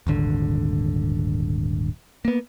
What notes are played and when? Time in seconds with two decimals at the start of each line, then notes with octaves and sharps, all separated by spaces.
0.07 D#1 G#1 D3
2.25 A#3 B3